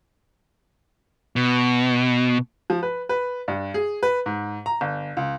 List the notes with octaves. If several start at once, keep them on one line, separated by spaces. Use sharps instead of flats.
B2
F3
B4
B4
G2
G#4
B4
G#2
A#5
G1
C#2